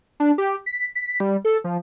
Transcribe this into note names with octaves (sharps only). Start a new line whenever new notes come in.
D4
G4
B6
B6
G3
A4
F3